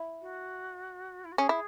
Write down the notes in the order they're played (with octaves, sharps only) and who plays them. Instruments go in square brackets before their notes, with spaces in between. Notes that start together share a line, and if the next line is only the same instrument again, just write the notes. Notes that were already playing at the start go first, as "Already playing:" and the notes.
Already playing: [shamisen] E4
[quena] F#4
E4
F#4
[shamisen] C#4 [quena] G#4
[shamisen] E4